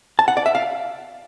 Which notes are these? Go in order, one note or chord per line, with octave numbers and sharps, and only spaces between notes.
A5
F#5
D5
E5
F5